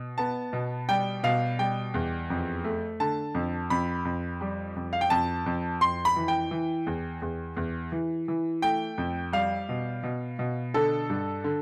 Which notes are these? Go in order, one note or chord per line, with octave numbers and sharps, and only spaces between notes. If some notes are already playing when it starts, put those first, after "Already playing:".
Already playing: B2
B3 A5
B2
G3 G5
B2 F5
G3 G5
E2
F2
A3
D3 A5
F2
F2 B5
F2
G3
F2
F5
G5
F2 A5
F2
F2 C6
B5
E3
G5
E3
E2
E2
E2
E3
E3
A3 G5
F2
G3 F5
B2
B2
B2
D3 A4
G2
D3